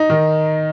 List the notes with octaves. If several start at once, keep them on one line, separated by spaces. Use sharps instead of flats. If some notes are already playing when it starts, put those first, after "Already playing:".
Already playing: D#4
D#3